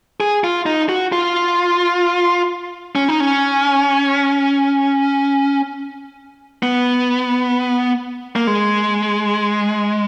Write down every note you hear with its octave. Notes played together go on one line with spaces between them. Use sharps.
G#4
F4
D#4
F#4
F4
C#4
D#4
C#4
B3
A#3
G#3